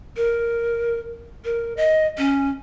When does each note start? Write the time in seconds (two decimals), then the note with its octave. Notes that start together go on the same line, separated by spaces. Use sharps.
0.17 A#4
1.45 A#4
1.77 D#5
2.18 C#4